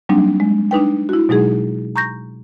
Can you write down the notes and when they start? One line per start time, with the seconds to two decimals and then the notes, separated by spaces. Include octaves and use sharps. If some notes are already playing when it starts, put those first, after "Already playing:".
0.09 F#3 G3 A#3 C4 D4 D#4
0.40 G#3
0.71 D4 D#4 B4 G5
1.09 E4 F#4
1.29 B2 F#3 G#3 D#4 G#4
1.96 A#5 C#6 G6 A#6